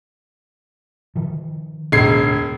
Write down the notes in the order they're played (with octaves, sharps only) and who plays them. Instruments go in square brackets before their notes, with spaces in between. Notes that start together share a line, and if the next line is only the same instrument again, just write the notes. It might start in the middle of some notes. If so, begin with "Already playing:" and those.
[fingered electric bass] D#3 F3
[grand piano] E1 G#6 C7 [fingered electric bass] D2 A2